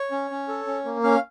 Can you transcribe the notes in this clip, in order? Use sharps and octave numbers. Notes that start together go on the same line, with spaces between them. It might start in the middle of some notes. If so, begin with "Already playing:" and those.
Already playing: C#5
C#4
C#4
A4
C#4
A#3
C#4 F5